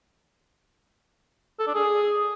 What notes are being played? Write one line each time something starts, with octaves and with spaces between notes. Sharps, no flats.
A4
D4
G#4